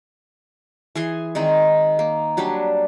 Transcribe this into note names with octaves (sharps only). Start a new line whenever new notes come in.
E3 G#4 G#5 C6
D#3 G#3 C4 D#4
A#3
F#3 G3 D4 G4